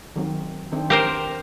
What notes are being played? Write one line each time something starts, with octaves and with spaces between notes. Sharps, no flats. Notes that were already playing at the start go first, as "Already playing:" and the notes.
D#3 F#3 C4
D#3 C4 D4
G4 A#4 C5